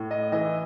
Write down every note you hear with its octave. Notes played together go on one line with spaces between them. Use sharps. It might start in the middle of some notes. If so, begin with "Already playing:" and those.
Already playing: A2
D#5
E3 D#5